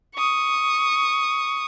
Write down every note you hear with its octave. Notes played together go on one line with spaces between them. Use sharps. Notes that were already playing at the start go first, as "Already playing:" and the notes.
C#6 D#6